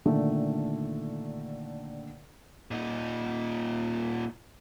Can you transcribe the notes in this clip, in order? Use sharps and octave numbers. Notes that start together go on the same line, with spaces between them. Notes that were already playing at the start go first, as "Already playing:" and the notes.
A#2 D3 D#3 A3
A#2 D#4